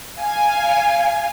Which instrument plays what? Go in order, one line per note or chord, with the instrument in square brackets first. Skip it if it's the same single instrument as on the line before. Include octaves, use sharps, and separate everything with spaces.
[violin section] F5 G#5